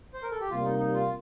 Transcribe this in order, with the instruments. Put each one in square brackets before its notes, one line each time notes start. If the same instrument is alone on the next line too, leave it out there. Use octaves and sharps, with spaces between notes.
[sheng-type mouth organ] C5
A#4
A4
G4
[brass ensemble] C3 G3 A#3 [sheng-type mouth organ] F4
[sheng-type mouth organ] D#4
D#4
F4